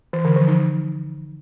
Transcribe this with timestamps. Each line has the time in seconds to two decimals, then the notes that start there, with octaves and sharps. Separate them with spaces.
0.13 E3
0.25 D3
0.36 F3
0.48 D#4